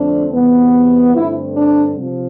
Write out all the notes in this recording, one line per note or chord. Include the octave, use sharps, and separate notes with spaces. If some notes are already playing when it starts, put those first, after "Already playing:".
Already playing: F2 D3 A3 C4 D4
E2 C3 G3 B3
G2 D3 A3 C4 E4
D4
C3 F3